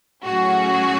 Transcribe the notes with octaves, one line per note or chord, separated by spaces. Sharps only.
A2 F#3 A3 C#4 F#4 G#4